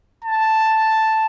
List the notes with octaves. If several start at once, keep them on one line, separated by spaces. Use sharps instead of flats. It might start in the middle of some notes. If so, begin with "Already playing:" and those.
A5